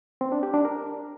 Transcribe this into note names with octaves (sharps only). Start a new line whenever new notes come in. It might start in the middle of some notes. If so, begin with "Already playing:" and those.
C4
D4
G4
D4
A#4